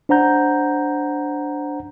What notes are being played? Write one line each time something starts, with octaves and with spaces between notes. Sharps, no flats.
D4 C5 F#5 A#5 G6